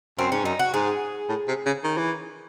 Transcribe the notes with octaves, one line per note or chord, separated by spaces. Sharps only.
F#2 C4
G#2 C#4
F#2 D#4
F#4
G#2 G#4
A2
C3
C#3
D#3
E3